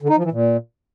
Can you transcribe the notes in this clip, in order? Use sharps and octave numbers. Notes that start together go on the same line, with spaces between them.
D3
D#4
F3
E3
A#2